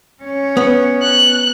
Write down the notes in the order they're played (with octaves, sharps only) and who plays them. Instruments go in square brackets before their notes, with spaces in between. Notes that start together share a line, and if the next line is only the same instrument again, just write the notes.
[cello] C#4 C#5
[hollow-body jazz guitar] B3
[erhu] F#6